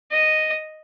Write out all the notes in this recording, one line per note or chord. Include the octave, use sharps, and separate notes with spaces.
D#5